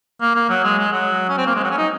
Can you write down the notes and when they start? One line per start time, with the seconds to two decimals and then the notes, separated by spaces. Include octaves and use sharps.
0.21 A#3
0.35 A#3
0.50 F#3
0.64 G#3
0.78 G#3
0.93 F#3
1.29 C#4
1.38 C4
1.46 A#3
1.55 G#3
1.64 F#3
1.70 C#4
1.78 D#4